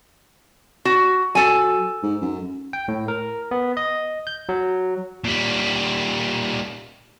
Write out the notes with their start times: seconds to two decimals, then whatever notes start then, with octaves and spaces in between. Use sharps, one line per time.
0.85 F#4
1.35 F#3 A4 G#5
2.03 G#2
2.22 F#2
2.73 G5
2.88 A2
3.08 A#4
3.51 B3
3.77 D#5
4.27 G6
4.49 F#3
5.24 A#2 G3